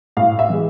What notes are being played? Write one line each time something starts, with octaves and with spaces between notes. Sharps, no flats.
A2 F5
E5
E3 G#3